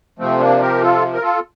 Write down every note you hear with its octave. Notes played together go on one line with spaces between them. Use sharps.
C3 F3 A3 C4
A#3 D4
G4 A#4
F4 A4
A#4
F4 A4